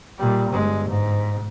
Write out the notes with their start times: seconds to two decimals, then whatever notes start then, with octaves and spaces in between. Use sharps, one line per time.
0.18 A#2 G3
0.51 G1 G#3
0.89 G#2